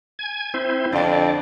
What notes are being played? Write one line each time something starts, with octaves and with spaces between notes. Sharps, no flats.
G#5 G#6
C4 E4 C5
F2 D3 D4 D5